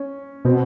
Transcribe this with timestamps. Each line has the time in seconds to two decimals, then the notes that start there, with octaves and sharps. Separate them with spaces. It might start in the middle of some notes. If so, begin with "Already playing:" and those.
Already playing: C#4
0.45 B2 C4